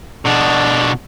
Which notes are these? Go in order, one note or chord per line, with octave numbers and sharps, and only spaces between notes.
B2 D4